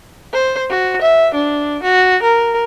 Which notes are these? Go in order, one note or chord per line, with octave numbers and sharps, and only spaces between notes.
C5
F#4
E5
D4
F#4
A#4